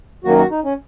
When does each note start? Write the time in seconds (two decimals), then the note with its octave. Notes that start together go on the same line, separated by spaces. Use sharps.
0.24 F#2 D#3 F#3 A#3 F#4
0.38 F#4
0.51 D#4
0.64 C#4